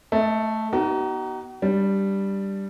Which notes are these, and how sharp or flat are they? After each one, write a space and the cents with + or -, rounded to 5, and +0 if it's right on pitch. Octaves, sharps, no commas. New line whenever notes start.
A3 +0 D#5 +35
B3 -15 D#4 +0 F#4 +45
G3 +0 D4 +0